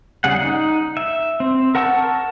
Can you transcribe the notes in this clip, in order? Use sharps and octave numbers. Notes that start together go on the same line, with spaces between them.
C#3 G3 G#4 F#5
D#4
E5
C4
A#4 F#5 A5 C#6 E6